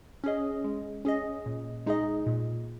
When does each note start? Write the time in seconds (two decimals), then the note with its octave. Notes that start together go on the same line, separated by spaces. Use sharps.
0.24 C#4 G#4 D#5
0.64 G#3
1.05 C#4 G#4 D#5
1.46 A#2
1.86 G#3 D#4 G#4 D#5
2.26 A#2